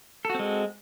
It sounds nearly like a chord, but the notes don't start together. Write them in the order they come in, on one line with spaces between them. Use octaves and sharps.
A4 F#4 C4 G#3